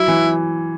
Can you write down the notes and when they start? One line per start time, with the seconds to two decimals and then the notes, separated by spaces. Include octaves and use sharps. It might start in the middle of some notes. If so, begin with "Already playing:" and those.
Already playing: F#3 E4
0.08 E3